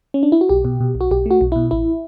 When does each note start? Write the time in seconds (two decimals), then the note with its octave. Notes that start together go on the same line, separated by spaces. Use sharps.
0.14 C#4
0.23 D4
0.32 E4
0.41 F#4
0.49 B1 G4
0.65 B2
0.81 B2
0.95 B1
1.01 F#4
1.11 B1 G4
1.26 A3 F#4
1.41 B1
1.52 B2 E4
1.71 A1 E4